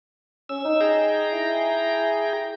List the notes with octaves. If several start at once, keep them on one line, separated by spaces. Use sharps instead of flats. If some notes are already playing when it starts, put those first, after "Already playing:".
C#4 E6
D#4
G#4 G5 A#5
E4